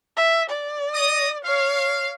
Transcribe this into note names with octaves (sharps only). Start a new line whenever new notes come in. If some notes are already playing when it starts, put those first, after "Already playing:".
E5
D5
D#5 D#6
C#5 F5